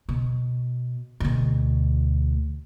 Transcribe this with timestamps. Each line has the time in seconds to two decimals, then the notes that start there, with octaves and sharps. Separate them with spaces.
0.09 B2
1.20 D2 B2